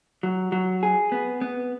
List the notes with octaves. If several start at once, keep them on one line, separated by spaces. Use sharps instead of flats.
F#3
F#3
G#4
B3
B3